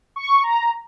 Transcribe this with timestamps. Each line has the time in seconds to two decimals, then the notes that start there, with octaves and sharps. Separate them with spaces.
0.16 C#6
0.43 A#5